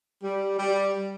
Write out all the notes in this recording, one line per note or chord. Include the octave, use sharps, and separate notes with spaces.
G3
G3